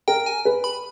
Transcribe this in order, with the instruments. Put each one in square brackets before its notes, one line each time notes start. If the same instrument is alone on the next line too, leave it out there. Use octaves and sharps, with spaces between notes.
[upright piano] A#4 [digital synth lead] G5
[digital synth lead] G#5
[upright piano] B4
[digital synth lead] B5